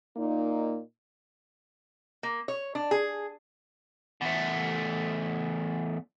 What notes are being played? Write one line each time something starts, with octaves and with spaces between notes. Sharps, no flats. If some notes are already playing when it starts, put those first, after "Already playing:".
A#2 A#3 D#4
A#3
C#5
D4
G#4
E2 A3